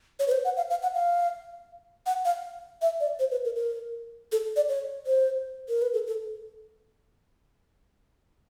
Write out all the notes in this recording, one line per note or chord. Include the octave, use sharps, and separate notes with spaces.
C#5
B4
C5
F#5
F5
F5
F#5
F5
F#5
F5
E5
D5
C5
B4
A#4
A#4
A4
D5
C#5
C5
A#4
B4
A4
A4